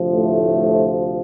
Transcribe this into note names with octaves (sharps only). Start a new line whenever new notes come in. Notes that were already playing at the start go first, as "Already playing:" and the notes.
Already playing: D2 C3 F3
A2 A3